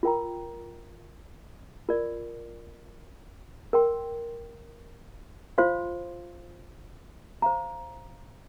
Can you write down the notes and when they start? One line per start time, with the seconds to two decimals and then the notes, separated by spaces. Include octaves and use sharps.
0.03 F4 A#4 G5 A#5
1.89 F4 A#4 D5
3.73 A#4 G5 C6
5.58 F4 C5 F5 C6
7.42 C5 F5 A#5